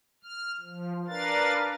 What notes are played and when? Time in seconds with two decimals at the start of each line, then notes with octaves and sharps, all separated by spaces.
0.23 F6
0.61 F3
1.08 D4 A#4 B4 F5 A6